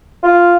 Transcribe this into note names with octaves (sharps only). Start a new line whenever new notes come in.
F4